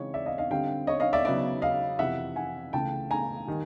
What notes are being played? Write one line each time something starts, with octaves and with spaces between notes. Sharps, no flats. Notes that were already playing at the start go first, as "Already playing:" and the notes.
Already playing: C#3 E3 G#3 C4 D#4 C#5
D5 E5
D#5 F5
D#5 F5
D3 G3 C4 D#4 F5 G5
C#5 D#5
D#5 F5
D5 E5
C#3 F#3 B3 D#4 D5 E5
D#5 F5
F2 C3 E3 E5 F#5
F#5 G#5
C#2 C#3 E3 A3 G5 A5
G#5 A#5
D#3 G3